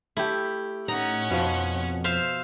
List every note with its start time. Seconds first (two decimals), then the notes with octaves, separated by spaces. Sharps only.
0.17 A3 E4 G4
0.88 A2 C#4 D#4 F#5 A#5
1.31 F2 B2 F3
2.04 C5 E5 F5